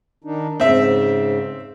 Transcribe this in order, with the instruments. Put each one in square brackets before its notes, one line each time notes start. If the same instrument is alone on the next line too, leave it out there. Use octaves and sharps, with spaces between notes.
[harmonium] D#3 D4 D#4
[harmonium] G#2 C#3 [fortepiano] C4 E5